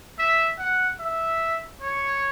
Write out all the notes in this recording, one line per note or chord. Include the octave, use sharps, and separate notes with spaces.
E5
F#5
E5
C#5